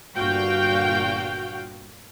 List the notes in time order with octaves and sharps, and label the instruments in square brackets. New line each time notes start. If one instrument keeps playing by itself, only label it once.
[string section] G1 A#2 F#4 F5 G5 G6